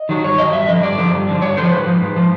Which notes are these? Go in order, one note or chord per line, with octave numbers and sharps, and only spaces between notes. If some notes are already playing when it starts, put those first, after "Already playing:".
Already playing: D#5
D#3 F#3
G2 C#5
D#3 F#3 D#5
G2 E5
D3 F3 D#5
G2 D5
D3 F3
G2
D3 F3
G2 C#5
D3 F3 C5
G#2 B4
F3
G#2
F3